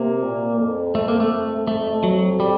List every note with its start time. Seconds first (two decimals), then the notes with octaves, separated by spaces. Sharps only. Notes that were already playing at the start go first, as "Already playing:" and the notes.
Already playing: C3 A#3
0.23 A#2
0.59 F2
0.95 F2 A3
1.08 A#3
1.20 A3
1.67 A3
2.03 F#3
2.40 G3